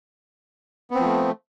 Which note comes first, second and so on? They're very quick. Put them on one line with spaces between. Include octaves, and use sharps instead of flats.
B3 C4 F3 A3